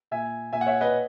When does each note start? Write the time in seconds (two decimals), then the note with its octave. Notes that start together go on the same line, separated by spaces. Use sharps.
0.11 A#2 E5 G#5
0.53 A#2 E5 G#5
0.61 F#5
0.66 C#5 E5
0.81 B4 D#5